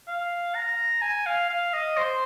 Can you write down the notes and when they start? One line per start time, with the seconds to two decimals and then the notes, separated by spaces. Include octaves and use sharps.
0.07 F5
0.55 A#5
1.02 G#5
1.26 F5
1.49 F5
1.73 D#5
1.97 C5